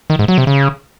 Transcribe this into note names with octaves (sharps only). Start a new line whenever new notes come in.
D#3
G#2
F#3
C3
C#3